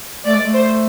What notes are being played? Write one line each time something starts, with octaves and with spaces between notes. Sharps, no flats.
A3 D5
G#3
A3
C5